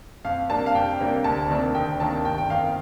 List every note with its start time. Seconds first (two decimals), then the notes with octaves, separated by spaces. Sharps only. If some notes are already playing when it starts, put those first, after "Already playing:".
0.25 F2 F5
0.49 C3 G3 A#3 D4 A5
0.66 F5
0.75 F2 G5
1.00 C3 G3 A#3 D4
1.24 D2 A5
1.50 C3 D#3 A#3 D4
1.74 D2 G5
2.00 C3 D#3 A#3 D4 A5
2.25 G1 G5
2.38 G5
2.50 F2 D#3 F5